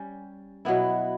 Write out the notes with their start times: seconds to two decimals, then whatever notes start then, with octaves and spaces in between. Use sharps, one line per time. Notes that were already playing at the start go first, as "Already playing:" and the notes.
Already playing: G3 C#4 G4
0.65 B2 F#3 B3 E4